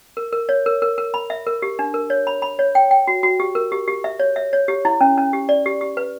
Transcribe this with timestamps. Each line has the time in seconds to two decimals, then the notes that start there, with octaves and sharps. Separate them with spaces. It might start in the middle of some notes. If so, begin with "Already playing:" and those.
0.17 A#4
0.33 A#4
0.49 C#5
0.66 A#4
0.82 A#4
0.98 A#4
1.14 B5
1.30 E5
1.47 A#4
1.62 G4
1.79 D4
1.94 A#4
2.10 C#5
2.27 B5
2.42 B5
2.59 C#5
2.75 G5
2.91 G5
3.08 F#4
3.23 F#4
3.40 G4
3.55 A#4
3.72 G4
3.87 G4
4.04 E5
4.19 C#5
4.36 E5
4.53 C#5
4.68 G4
4.85 E4
5.01 C#4
5.17 C#4
5.33 G4
5.49 D5
5.66 G4
5.81 G4
5.97 B4